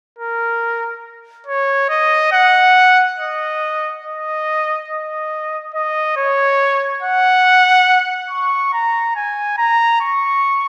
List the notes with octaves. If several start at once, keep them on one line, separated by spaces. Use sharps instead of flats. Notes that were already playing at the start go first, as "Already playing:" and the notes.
A#4
C#5
D#5
F#5
D#5
D#5
D#5
D#5
C#5
F#5
C#6
A#5
G#5
A#5
C#6